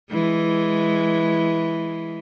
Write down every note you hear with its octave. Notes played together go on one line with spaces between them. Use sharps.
E3 G#3